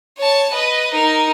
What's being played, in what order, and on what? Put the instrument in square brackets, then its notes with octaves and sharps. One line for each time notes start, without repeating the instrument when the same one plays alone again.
[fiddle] C#5 A5
B4 D#5
D#4 A#4